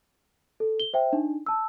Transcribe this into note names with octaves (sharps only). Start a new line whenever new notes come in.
A4
G7
C5 E5 G5
D4 D#4
A5 E6